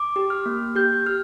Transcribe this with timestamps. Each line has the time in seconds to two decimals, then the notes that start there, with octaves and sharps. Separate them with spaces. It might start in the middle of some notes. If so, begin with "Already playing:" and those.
Already playing: D6
0.16 G4
0.30 F6
0.46 A#3
0.76 G4 G6
1.06 G4 F6